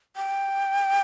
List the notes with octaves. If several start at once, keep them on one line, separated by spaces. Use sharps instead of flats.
G5